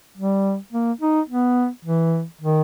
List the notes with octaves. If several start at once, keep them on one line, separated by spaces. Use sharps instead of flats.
G3
A#3
D#4
B3
E3
D#3